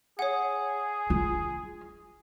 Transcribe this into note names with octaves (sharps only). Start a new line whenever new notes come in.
G#4 C#5 F#5
F4